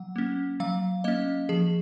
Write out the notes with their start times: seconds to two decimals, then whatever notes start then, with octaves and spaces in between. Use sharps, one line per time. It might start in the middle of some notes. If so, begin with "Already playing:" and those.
Already playing: F#3 F#5
0.16 A#3 C#4
0.60 F#3 F5
1.04 A#3 C#4 D#5
1.49 F3 G#4